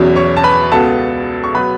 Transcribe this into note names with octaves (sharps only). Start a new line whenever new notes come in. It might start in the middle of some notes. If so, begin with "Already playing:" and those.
Already playing: E2 B2 F#3 C#4
C#5 C#6
A5
B4 B5
C#2 B2 B3 A4 A5
C#6
B2 F#3 B3 B4 B5